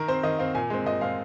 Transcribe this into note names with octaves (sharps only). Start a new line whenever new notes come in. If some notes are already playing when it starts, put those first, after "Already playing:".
Already playing: D#3 A#4
C4 C5
D#3 D#5
C4 F5
A#2 G#5
G#3 C4
A#2 D#5
G#3 C4 F5